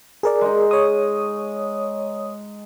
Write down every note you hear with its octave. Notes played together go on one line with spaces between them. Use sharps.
G#4 A#4 D5
G#3 D#4
C#5 D#6